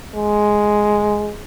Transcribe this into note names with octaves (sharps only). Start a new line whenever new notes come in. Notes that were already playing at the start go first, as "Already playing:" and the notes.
G#3